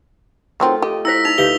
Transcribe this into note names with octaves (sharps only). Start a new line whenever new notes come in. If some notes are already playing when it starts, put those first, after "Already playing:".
D#3 F#3 A3 C4 F4
G4 D#5
E4 C5 E6 A#6 B6
D#4 F7
D2 D#4 G4 B4 F5 G6 G7